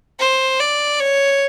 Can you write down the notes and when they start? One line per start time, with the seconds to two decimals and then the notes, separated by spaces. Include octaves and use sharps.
0.19 C5
0.60 D5
1.00 C#5